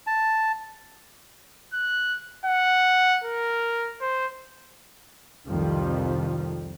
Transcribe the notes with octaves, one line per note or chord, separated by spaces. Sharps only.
A5
F#6
F#5
A#4
C5
C2 F2 D#3 F3 G3